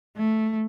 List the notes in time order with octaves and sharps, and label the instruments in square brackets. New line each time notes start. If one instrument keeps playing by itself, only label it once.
[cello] A3